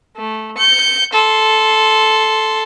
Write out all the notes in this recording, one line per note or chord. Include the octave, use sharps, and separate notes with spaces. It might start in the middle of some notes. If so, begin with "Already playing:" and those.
A3
G6 C#7
A4 C6